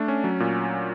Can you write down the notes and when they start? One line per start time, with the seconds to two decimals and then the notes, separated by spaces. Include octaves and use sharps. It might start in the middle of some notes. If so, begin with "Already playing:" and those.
Already playing: A3 D4
0.08 C#4
0.24 F#3
0.40 A#2